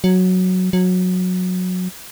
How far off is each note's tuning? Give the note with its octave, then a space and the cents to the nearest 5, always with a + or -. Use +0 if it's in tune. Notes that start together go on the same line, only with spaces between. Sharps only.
F#3 -5
F#3 -20